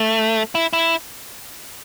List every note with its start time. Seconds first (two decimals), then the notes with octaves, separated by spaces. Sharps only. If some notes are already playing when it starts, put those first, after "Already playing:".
Already playing: A3
0.55 E4
0.73 E4